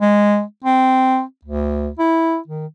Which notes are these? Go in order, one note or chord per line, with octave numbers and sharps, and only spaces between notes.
G#3
C4
D2
E4
D#3